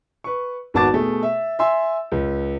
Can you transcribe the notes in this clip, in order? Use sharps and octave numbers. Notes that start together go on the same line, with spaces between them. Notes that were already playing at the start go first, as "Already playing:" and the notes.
B4 C#6
G#1 B3 F#4 A5 D6 A6
B2 A3 G#4
E5
E5 G#5 C6 E6
C#2